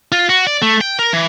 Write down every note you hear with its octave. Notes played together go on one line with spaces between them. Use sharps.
F4
F#4
D5
A3
G5
A#4
E3